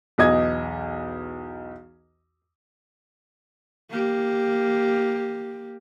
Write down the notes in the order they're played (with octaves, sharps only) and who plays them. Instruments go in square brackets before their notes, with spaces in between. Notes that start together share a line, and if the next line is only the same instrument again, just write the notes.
[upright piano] B1 E2 D#5 G#6
[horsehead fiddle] A#3 G4